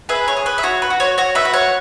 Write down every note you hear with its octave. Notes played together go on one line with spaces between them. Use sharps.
G#4 B4 E5
C#5
G#4
B4
E5
F#4 C#5
B4
F#4
C#5
F#4 C#5
B4 E5
F#4
C#5 F#5